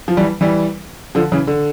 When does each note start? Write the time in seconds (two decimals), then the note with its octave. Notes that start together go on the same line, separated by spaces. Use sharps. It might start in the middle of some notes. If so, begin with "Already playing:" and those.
0.08 F3
0.17 E3 G3
0.41 E3 G3
1.15 D3 F3
1.32 C#3 E3
1.47 D3